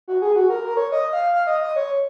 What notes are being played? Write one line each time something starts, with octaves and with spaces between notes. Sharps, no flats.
F#4
G#4
F#4
A#4
A#4
C#5
D#5
F5
F5
D#5
D#5
C#5